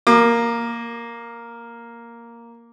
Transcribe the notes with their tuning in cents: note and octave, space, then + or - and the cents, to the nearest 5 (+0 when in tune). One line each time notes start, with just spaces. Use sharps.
A#3 +0 D6 +35